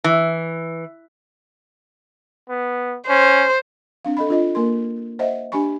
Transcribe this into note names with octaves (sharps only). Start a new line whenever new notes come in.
E3
B3
C#4 C5
C4 D4 F5
A4 D#5 B5
D4 F4 D#5
A#3 A#4 C6
C5 D#5 E5 F#5
D4 G4 G#5 B5 C#6